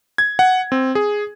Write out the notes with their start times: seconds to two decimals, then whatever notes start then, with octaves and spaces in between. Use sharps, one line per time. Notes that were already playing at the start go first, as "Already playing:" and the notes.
0.18 G#6
0.39 F#5
0.72 C4
0.95 G#4